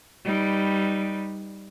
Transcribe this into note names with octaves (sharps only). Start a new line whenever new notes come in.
G3 D#4 B4